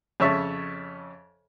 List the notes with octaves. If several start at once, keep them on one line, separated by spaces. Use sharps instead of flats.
F2 C#3 C#5 E5 A5 C#6